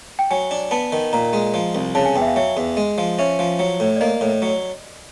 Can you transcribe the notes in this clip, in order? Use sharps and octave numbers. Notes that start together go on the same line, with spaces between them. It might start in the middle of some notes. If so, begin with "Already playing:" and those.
G5
F#3 G#5
D4
B3 A5
D#3
A#2 A#5
G#3
F3
C2
C#3 A5
G#5
E2 G5
E5
F5
F#3 E5
E2
G#3
F3
C#4 E5
F3
F#3
A2
D5
A#3 D#5
A2
F#3